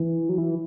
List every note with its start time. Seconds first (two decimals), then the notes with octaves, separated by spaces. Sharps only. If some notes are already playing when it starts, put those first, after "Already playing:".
Already playing: E3
0.29 F#3
0.38 E3